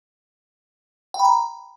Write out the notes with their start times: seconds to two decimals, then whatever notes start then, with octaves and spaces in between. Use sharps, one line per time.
1.14 G5
1.19 B5
1.25 A#5